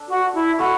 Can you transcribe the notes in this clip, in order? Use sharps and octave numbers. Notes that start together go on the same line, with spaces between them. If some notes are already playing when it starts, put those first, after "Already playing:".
Already playing: D4 A4
F#4
E4
A3 E4 F#4 A4